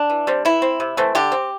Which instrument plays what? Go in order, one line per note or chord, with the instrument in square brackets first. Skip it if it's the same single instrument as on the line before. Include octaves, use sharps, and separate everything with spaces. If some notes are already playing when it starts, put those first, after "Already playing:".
Already playing: [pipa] D4
E3
G3 C4
E3 E4
C4
C3
E3 A3 C4
D3 G4
C4